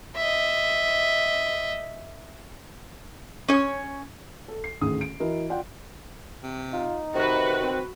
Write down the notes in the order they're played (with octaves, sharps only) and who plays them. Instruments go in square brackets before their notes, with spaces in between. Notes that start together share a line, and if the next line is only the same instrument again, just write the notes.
[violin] D#5 E5
[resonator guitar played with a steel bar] C#4 C#5
[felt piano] A4
C7
A1 D2 D#3 G#4 D#6
D7
E3 E4 F#4 A#4 D#5
F4 D5 F#5 G5
[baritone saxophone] C3
[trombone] D#4 [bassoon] F4
[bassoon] C3 [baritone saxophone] D#3 [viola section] F#4 B4
[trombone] C4